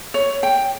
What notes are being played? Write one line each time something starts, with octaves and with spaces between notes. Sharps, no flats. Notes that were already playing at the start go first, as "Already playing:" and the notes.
C#5
G5